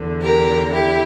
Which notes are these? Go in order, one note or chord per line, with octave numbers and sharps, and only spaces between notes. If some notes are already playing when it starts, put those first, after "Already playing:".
Already playing: E2 D3
G4 A#4
E4 G4